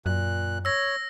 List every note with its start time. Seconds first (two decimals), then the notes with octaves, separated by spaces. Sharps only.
0.06 F#2 A#2 F#6
0.65 C#5 E6 A#6